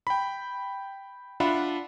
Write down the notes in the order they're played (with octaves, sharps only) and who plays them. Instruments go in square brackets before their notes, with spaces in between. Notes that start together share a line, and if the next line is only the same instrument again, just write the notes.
[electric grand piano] G5 B5
D4 F4 E5 F#5 B5